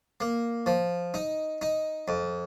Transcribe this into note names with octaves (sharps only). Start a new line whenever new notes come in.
A#3
F3
D#4
D#4
F2